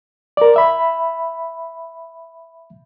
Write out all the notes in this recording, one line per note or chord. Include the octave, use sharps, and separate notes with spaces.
A#4 D5
E5 B5